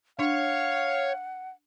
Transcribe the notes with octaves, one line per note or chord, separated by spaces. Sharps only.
D4 C#5 F5 F#5